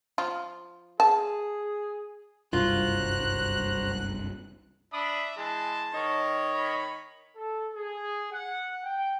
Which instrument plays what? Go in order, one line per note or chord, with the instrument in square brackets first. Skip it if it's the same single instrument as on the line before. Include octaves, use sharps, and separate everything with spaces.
[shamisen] F3 F4
[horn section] G#4 [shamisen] A5
[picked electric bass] F#1 C2 G2 [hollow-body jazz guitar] F4 [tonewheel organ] F#4 C5 A#5 [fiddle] F#6
[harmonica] D4 B5 D#6 [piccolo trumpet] E5
[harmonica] E3 G#3 [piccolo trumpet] A5
[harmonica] D#3 C#5 [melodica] D#5
[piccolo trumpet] B5
[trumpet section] A4
G#4
F#5
G5